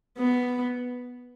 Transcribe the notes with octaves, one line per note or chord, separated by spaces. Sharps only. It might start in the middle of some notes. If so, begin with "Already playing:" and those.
B3